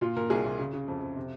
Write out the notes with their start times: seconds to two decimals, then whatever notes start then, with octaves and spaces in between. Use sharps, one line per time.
0.01 A#2 F4
0.16 A#2 A#4
0.30 C2 G#4
0.45 C2
0.59 C#3
0.73 C#3
0.88 F2
1.02 F2
1.16 C3